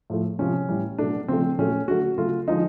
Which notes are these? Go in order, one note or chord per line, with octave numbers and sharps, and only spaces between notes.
A2 F3 A3
C3 F3 G#3 C#4
A2 E3 G3
B2 F#3 A3 D4
C#3 F3 A3 C4
A#2 F#3 A3 C#4
D3 F#3 A3 F#4
C#3 F#3 A3 F4
D3 F3 G#3 D#4